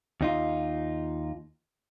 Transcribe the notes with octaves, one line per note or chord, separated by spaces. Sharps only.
D#2 D#4 F4